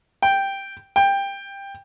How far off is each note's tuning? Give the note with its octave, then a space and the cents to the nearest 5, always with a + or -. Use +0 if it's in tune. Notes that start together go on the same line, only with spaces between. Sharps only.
G5 +0
G5 +15